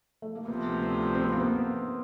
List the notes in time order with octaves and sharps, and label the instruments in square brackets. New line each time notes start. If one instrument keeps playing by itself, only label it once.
[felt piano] A3
A#3
[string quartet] D2 C3 F3 [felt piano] B3
[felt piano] C4
C4
B3
A#3
B3